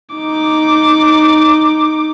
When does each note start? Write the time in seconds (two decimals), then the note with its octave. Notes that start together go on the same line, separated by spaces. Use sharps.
0.16 D#4 D6